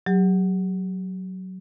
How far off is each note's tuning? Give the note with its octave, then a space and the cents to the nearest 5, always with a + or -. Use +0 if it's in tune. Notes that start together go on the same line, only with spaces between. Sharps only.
F#3 +10 G4 +35